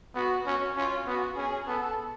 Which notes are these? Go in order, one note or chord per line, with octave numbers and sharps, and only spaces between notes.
B3 F#4
C#4 F#4
C#4 F4
B3 F#4
C#4 G#4
B3 A4